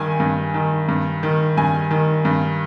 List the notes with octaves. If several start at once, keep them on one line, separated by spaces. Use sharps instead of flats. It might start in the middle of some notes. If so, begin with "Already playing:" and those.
Already playing: G2 D#3 G#5
G2
D#3
G2
D#3
G2 G#5
D#3
G2